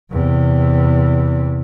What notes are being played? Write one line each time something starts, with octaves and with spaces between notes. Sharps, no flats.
E2 C3